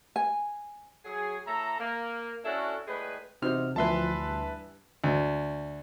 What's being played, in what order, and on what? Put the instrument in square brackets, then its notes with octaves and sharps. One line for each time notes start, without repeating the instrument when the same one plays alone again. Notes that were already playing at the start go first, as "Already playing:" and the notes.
[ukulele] G#5
[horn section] F#3 G#4
A2 A4 E5 A#5
A#3
C#4 D4 E4 F#4 A4
A2 G3 G#3 B4
[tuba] E2 [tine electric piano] C3 F6 [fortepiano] D#4 F#4 C5
[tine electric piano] D2 C6 [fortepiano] E3 B3 [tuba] F3 [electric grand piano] B4 E5 A5
[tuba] G2
[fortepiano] D2